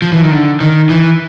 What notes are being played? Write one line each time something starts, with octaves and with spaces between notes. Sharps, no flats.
F3
E3
D#3
D3
D#3
E3